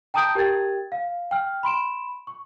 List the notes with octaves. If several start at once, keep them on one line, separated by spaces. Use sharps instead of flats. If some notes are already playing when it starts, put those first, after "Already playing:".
G5 A5 A#5 D#6 G6 D7
G4 A#4 G5 G#6 A6
F5
G5 F6
B5 C6 D7 E7
C#6